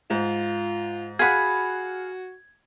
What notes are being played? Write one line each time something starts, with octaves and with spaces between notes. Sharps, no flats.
G#2 F4
F#4 G#4 F5 F#5 B5 G#6